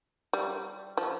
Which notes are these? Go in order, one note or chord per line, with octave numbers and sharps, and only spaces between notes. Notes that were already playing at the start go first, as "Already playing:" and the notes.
G3
F3